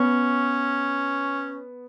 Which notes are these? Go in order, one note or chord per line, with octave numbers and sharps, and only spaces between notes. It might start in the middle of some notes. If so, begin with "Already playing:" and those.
Already playing: B3 C#4